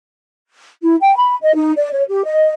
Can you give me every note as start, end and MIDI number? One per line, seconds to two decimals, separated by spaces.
0.83 0.96 64
1.01 1.14 79
1.16 1.36 83
1.43 1.54 75
1.54 1.72 63
1.76 1.91 74
1.92 2.03 73
2.08 2.22 67
2.25 2.54 75